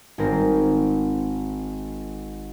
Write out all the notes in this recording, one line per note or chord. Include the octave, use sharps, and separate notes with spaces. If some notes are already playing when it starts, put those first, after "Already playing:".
G#1 C4 A#4